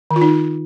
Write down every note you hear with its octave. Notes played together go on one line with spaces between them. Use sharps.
D#3
F4
D#4